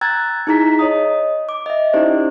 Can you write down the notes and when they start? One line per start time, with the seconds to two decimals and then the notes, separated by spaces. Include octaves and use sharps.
0.01 G5 A#5 E6 F#6 G#6 A6
0.47 D#4 E4 G#4 A#5 B6
0.79 C#5 D#5 D#6
1.49 D6
1.66 D#5 E5
1.93 C#4 D#4 E4 G4 C5 D5